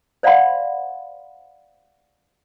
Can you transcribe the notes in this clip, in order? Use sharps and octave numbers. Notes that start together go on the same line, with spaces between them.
C5 D5 F5 F#5 B5 C6